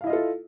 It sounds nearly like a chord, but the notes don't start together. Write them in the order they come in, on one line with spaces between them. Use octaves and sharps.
F5 E4 D#5 F4 A4